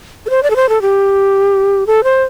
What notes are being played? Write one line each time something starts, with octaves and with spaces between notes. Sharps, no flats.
A4
C5
D5
A4
C5
A4
G4
A4
C5